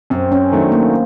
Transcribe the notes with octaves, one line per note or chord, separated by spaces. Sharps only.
F#2 C4
C#4
D#3 F#3 A3 D4
A#3